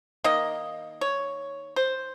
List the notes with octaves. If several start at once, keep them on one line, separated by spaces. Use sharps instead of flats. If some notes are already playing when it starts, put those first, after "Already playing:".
D#3 A#3 D#5
C#5
C5